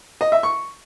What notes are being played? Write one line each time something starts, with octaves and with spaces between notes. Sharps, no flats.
D#5
E5
C#6